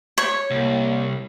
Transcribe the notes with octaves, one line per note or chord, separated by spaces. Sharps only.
C#5
C2 A#3